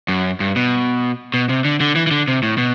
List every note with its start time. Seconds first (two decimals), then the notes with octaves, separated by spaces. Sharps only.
0.08 F#2
0.40 G2
0.56 B2
1.34 B2
1.49 C3
1.65 D3
1.81 D3
1.96 E3
2.07 E3
2.11 D3
2.28 C3
2.43 A2
2.58 B2